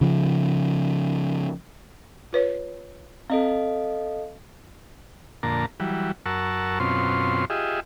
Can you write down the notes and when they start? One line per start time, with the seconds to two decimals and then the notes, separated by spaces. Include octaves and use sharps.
0.01 C#3 F3
2.33 F4 B4 C#5
3.30 C4 A4 D#5 F5
5.43 F2 A#2 D3 A#3 A5 A#5
5.80 E3 F#3 G3
6.26 F#2 A#4 F#5 A5 C#6 E6
6.80 F#2 B2 C4 C#4 F4 C6
7.50 F4 G4 G#4 D#5 E5